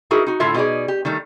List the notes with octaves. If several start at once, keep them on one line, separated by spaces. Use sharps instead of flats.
D#4 E4 F#4 G#4 A#4
D#4 F#4
A2 D3 E4 F4 E5
B2 G3 D#4 F4 G#4 D5
G4
D#3 G3 A3